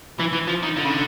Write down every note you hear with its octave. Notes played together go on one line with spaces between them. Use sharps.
E3
E3
F3
D#3
D3
C#3
D3